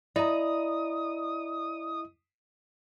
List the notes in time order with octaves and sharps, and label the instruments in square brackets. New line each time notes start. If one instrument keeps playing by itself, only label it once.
[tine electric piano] E4 D#5 [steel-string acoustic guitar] D5 A#5 [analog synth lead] D#6